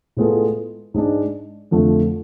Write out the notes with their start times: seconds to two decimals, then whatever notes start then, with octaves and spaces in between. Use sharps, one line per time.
0.17 A2 G#3 B3 F4 A4
0.94 G#2 G#3 D4
1.71 F2 D3 F3 A3